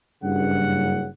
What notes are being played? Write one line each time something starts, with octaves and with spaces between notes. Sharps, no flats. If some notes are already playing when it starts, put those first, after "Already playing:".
F#1 G2 C#3 F#5